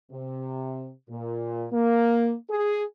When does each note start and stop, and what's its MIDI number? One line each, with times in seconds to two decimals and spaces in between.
0.12 0.92 48
1.10 1.67 46
1.72 2.35 58
2.50 2.83 68